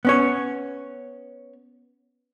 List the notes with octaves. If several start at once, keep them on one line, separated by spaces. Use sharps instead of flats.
B3 C#4 C#5